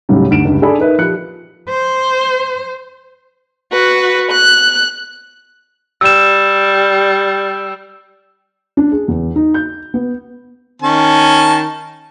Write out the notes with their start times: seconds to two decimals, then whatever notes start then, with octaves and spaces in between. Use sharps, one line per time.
0.09 C#2 A2 C#3 F#3 G3
0.31 D2 G2 D7 E7
0.45 C#2 G2
0.62 D4 G#4 A4 D5 B5
0.78 D#4 A#4 B4 E5
0.99 F3 G4 F#6 C#7
1.69 C5
3.73 F#4 B4
4.32 F#6
6.01 G3 E6 E7
8.77 D4
8.91 G#4
9.08 E2
9.36 D#4
9.54 G6
9.94 B3
10.82 D#3 C#4 A5